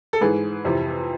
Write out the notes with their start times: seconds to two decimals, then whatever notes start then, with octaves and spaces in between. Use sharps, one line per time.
0.13 A4
0.21 G#2 E3 G#4 B4
0.65 F2 C3 E3